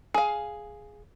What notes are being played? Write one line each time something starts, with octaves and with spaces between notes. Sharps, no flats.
G#4 F5